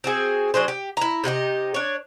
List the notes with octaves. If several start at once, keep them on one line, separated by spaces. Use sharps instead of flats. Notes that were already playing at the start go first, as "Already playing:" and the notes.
C4 F#4 G#4
F#3 D4 G#4 C5
G4
E4 A#5
C3 D#4 F#4 G4
D4 C#5